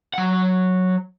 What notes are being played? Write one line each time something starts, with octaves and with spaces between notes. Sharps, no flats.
F#3 F#5